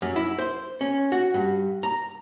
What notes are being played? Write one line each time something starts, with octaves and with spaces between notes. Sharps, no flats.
F#2
E4
C5
C#4
F#4
G2
A#5